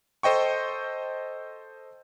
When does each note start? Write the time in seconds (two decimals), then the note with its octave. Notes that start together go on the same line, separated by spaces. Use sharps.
0.23 A4 C5 D#5 G5 C#6